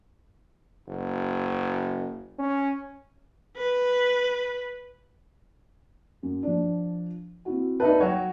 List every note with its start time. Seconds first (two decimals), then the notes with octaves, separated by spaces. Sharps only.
0.88 F#1
2.39 C#4
3.57 B4
6.23 F#2
6.43 F3 D4
7.45 C4 E4 F#4
7.80 D#4 B4 D5 E5 A5
8.00 F#3 F#4 C#5 G5